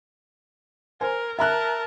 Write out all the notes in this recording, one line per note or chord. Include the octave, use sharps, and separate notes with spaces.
A#4 C5 G#5
A#4 E5 A5 A#5 F#6